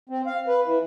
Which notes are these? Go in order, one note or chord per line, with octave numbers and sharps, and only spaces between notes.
C4
F5
B4
E3